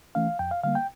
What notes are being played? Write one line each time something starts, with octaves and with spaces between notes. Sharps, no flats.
E3 A3 C#4 F5
F2 G5
F5
D3 G3 A#3 F5
G5